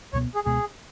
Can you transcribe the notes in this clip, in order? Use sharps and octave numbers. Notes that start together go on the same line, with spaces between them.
C#2 B2 G#3 B3 C#5
G#4
C#2 B2 G#3 B3 G#4